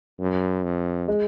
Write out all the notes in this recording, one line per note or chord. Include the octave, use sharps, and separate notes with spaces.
F#2
F2
G#3